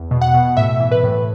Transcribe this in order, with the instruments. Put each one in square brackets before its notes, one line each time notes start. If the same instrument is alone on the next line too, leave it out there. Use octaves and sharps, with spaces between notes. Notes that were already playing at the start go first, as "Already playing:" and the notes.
Already playing: [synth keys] E2
B2
F#5
B2
A2 E5
E3
B4
A2